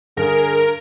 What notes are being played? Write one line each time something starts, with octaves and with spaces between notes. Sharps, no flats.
G2 D3 G#4 A#4